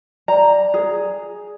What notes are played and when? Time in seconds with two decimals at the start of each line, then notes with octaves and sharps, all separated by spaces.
0.28 D5 A#5
0.74 G#4